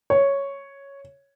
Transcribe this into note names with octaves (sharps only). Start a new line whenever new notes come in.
C#5